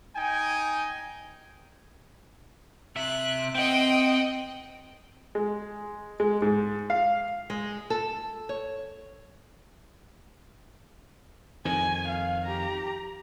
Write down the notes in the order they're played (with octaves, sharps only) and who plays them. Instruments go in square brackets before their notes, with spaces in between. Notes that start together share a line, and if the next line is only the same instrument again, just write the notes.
[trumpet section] D#4 G5 G#5
[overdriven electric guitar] C3 E5 [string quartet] F#6
[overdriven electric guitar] C4 [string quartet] D#5 F#5 G5
[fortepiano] G#3
G#3
G#2
F5
[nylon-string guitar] G#3
A4
C#5
[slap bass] F2 D#3 [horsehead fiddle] G#5
[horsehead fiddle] F5
G4 A#5